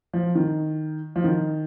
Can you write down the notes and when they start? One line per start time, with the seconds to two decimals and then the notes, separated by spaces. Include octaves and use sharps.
0.13 F3
0.35 D#3
1.16 F3
1.24 D#3